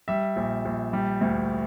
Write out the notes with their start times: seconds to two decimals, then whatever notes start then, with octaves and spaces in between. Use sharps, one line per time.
0.08 G3 E5
0.36 A#1
0.65 A#1
0.93 G3
1.21 D2